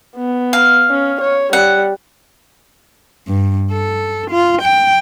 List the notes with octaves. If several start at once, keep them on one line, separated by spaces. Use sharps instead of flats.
B3
F5
C#4
C#5
G3 F#5
G2
A4
F4
G5